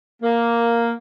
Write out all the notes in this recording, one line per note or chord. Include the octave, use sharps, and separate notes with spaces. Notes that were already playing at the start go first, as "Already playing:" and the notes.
A#3